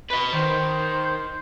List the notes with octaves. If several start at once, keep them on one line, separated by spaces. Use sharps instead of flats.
B4 D#5 B5
D#3 C5